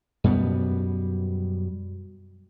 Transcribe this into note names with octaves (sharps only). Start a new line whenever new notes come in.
F#2 B2 G3 B3